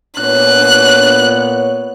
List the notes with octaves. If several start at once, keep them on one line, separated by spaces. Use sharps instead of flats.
A#2 B3 C#5 F#6